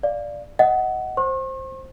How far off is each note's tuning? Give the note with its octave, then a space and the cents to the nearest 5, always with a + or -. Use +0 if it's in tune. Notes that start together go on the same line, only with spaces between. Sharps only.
D5 +0 F5 +0
D#5 +20 F#5 +15
C5 +10 C#6 -45